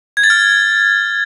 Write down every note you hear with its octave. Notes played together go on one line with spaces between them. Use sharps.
G#6
A6
F6